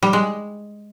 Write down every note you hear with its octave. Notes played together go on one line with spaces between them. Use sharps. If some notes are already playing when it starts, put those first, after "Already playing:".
G3
G#3